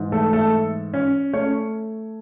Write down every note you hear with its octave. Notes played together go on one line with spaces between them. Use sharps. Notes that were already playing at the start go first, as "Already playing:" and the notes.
Already playing: G#2 E3
A3 A4
A3 A4
C#4 C#5
A3 C#4 C#5